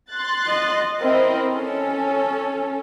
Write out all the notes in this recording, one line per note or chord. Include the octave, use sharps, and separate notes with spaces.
C6 F#6 A6
D#5
C4 E4 A#4 D#5
C#4 A4